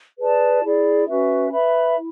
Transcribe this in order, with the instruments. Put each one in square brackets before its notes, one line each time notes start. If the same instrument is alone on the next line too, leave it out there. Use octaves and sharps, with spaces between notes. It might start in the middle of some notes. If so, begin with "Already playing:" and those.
[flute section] G#4 B4 D5 A5
E4 G#4 D5
C#4 F#4 B4 E5
B4 E5 B5
E4